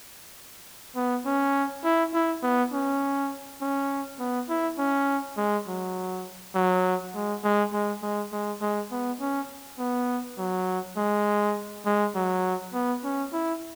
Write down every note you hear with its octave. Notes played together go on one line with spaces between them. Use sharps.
B3
C#4
E4
E4
B3
C#4
C#4
B3
E4
C#4
G#3
F#3
F#3
G#3
G#3
G#3
G#3
G#3
G#3
B3
C#4
B3
F#3
G#3
G#3
F#3
B3
C#4
E4